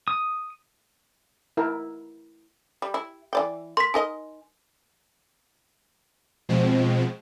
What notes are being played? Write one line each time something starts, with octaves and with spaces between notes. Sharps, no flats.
D#6
E4 A#4
G3
E4
E3 D5 G5
A#4 C6 B6
D#4 A#4 D#5 G#5
B2 F3 G#3 C4